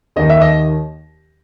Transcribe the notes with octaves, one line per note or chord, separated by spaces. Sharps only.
D#2 D#3 D#5
E5
D#5